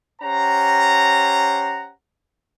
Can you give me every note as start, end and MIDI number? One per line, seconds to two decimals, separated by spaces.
0.22 1.92 61
0.22 1.92 67
0.22 1.92 72
0.22 1.92 78
0.22 1.92 82